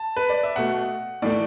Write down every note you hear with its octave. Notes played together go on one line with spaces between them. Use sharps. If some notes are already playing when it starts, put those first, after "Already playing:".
Already playing: A5
B4
D5
E5
B2 A3 F#5
A2 E3 A3 D5